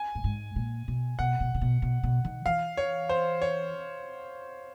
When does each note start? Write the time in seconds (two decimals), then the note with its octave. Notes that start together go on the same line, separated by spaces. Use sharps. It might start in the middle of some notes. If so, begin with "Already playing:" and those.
Already playing: G#5
0.15 A2
0.24 G#2
0.56 A#2
0.88 B2
1.19 B2 F#5
1.40 B2
1.54 C3
1.61 B2
1.82 B2
2.03 B2
2.25 D#3
2.46 E3 F5
2.77 C#5
3.09 C5
3.42 C#5